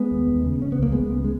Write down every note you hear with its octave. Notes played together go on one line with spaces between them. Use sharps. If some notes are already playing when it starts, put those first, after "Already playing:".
Already playing: G#3 B3
D#2
D#2
C#3
C#3 C#4
B3
C#2 A#3
C#2 G#3 B3
C#3
G#3